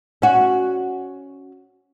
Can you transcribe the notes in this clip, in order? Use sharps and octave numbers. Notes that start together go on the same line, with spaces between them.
C#4 F#4